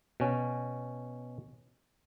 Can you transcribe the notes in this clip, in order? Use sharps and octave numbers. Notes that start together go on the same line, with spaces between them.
B2 C#4